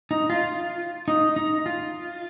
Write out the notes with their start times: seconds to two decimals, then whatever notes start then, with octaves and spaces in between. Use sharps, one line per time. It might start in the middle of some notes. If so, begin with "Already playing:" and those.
0.11 D#4
0.30 F4
1.08 D#4
1.36 D#4
1.66 F4